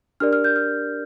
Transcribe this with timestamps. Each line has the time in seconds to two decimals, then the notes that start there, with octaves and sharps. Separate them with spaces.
0.20 D4 G4 A#4 D5 F6
0.33 F6
0.44 G6
0.56 F6